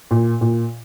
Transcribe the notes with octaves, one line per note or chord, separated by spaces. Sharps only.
A#2
A#2